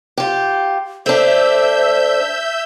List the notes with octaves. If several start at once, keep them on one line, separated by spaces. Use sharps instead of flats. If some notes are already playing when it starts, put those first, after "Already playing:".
F4 G4
A3 D4 C5 E5 E6 G6